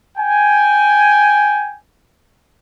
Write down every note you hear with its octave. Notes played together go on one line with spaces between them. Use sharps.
G5 G#5